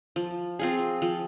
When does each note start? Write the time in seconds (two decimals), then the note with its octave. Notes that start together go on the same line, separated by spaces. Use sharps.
0.16 F3
0.59 C4 F4 G#4
1.02 F3